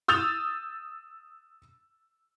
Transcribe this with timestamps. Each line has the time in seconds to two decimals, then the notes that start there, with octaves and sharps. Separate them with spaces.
0.08 D#6 E6 G6 A6 F7